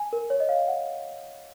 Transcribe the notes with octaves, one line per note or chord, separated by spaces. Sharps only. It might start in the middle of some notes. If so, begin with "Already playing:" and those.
Already playing: G#5
A#4
C#5
D#5
F5
F#5